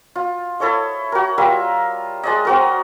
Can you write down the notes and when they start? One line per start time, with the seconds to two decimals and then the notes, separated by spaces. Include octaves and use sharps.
0.16 F4
0.60 E4 A4 C#5 D#5
1.12 F#4 A#4
1.38 G3 F4 A#4 E5
2.23 G#3 D5 D#5
2.45 C4 F#4 A#4